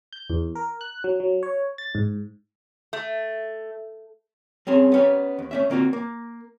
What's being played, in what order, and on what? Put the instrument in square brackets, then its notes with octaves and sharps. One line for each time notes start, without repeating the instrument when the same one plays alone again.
[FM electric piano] G6
E2
A#4
F#6
F#3
F#3
C#5
A6
G#2
[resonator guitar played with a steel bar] A3
[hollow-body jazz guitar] G3 C4 C#4 G#4
B3 C#4 G4
D#2
A3 C#4 E5
D3 A#3 C4 F4 F#4
A#3